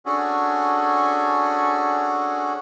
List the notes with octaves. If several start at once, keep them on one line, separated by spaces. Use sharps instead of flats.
C#4 D4 F#4 G#4 A4